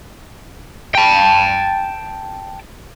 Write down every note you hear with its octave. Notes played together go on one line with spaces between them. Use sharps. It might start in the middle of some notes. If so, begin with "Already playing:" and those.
G5 A5